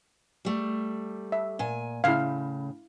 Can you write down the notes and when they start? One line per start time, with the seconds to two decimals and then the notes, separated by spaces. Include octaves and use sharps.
0.45 G3 A3
1.32 E5
1.59 A#2 G#5
2.04 A2 C#3 E4 F5